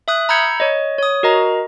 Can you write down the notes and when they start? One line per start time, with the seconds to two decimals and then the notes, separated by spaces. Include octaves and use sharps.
0.08 E5 D#6 F#6
0.29 A#5 B5 E6 G6 G#6 C#7
0.60 C#5 D#5
0.98 C#5 D#6
1.23 F#4 A#4 D#5 A#5